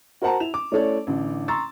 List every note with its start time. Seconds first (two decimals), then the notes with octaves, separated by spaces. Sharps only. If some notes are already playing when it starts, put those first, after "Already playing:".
0.22 F#4 A#4 C5 F#5 A5 A#5
0.40 E4 E7 F7
0.54 D6
0.72 A3 C#4 E4 A4 C#5 D5
1.07 A1 D3 D4
1.48 A#5 C6 C#6 E6 A6